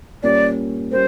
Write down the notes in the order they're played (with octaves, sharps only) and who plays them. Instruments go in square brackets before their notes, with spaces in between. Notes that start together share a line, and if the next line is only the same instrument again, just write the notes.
[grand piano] A#2 G3 A#3 C#4 [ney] D5
[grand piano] A#2 G3 A#3 C#4 [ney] C5